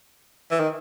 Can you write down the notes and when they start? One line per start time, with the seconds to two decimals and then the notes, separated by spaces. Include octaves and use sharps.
0.51 E3
0.60 D#3